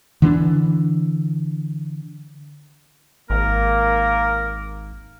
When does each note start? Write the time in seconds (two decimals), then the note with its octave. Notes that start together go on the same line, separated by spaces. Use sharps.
0.22 D3 E3 C#4 D4
3.30 G#1 A#3 A#4